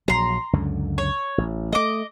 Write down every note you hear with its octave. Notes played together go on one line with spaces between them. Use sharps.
A#1 F#3 A#5 C6
C#2 F#2 D3
C#5
A1
G#3 A3 D#5 D6